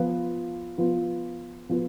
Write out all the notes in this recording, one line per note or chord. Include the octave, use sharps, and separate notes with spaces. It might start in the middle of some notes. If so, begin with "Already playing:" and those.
Already playing: F3 B3 F4 B4
F3 B3 F4 B4
F3 B3 F4 B4